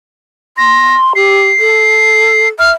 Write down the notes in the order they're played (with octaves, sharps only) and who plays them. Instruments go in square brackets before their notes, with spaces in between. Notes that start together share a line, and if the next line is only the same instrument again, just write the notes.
[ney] C6 [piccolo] A#6
[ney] G4 [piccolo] C7
[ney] A4
[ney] E5 [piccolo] F6